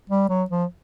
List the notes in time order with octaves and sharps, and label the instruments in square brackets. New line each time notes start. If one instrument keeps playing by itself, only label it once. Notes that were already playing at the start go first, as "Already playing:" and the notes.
[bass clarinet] G3
F#3
F3